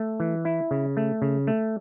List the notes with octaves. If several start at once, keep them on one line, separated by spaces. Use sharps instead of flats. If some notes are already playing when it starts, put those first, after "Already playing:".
Already playing: A3
E3
E4
C#3
A3
C#3
A3